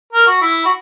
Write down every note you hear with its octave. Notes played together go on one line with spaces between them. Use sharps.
A#4
F#4
E4
F#4